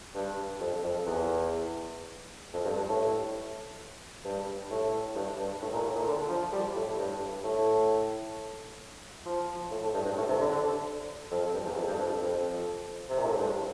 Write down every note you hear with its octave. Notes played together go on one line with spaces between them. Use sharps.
G2
F2
F2
E2
F2
G2
G2
A2
G2
A2
G2
G2
A2
A#2
A2
A#2
D3
F3
G3
A2
G2
A2
F3
A2
A2
G2
G2
A2
C3
D3
D3
F2
G2
E2
F2
G2
F2
F2
C3
A#2
A2
G2